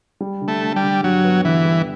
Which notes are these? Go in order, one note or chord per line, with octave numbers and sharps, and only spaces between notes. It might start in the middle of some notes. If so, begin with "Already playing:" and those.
G3
D3
A3
D3
G3
D3
G2 F#3
B3
D3 E3
G3